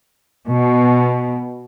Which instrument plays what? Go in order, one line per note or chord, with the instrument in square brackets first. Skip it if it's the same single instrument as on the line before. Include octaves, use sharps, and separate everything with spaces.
[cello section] B2